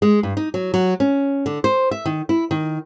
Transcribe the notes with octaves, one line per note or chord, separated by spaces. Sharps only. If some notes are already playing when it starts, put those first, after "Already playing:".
G#3
G2
D#4
F#3
F#3
C#4
D3
C5
E5
D#3
E4
D#3